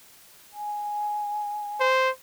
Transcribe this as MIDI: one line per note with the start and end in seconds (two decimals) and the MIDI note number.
0.53 1.86 80
1.80 2.10 72